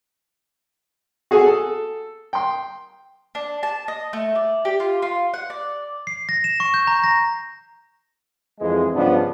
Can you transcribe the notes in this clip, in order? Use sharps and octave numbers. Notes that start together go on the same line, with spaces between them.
F#4 G#4 A4 G#5
A4
G5 C6
D4
A5
D#5
A3
D5
G4
F4
F4
F#5
D5
C7
A#6
E7
C#6
G6
A#5
A#6
F2 E3 G#3
G2 C#3 F3 B3 D4